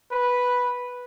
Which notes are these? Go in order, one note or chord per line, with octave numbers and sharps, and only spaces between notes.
B4